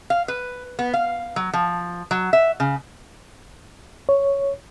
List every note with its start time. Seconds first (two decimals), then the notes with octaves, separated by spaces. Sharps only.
0.10 F5
0.28 B4
0.79 B3
0.94 F5
1.36 F#3
1.53 F3
2.11 F#3
2.33 E5
2.60 C#3
4.09 C#5